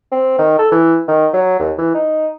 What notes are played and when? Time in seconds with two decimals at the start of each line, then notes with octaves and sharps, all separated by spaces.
0.12 C4
0.39 D#3
0.59 A4
0.72 E3
1.08 D#3
1.33 F#3
1.60 D#2
1.78 E3
1.95 D#4